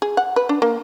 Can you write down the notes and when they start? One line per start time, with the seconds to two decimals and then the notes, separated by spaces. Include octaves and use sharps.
0.02 G#4
0.17 F#5
0.36 B4
0.49 D4
0.62 A#3